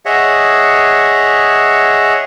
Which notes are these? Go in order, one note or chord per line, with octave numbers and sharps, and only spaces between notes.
G#4 C#5 D#5 E5 F#5